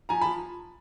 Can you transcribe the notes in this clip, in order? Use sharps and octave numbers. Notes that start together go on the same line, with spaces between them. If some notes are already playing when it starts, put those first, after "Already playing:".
F3 G#5 A#5
F3 A5 B5